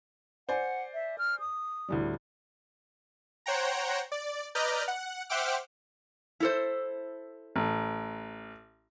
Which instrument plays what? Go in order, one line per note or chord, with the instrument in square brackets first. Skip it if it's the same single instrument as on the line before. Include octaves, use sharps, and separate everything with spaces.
[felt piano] C5 D5 G#5 [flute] F#5
[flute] E5
F6
D#6
[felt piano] D2 A2 G3
[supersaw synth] C5 C#5 F#5 G5 A#5
D5
B4 D5 D#5 A#5 F6 G6
F#5
C5 E5 F#5 G5 D6 F6
[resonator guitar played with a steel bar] E4 A4 C5
[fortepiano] A1